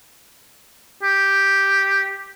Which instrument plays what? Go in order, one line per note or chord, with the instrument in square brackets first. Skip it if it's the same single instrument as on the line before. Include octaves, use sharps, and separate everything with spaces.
[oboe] G4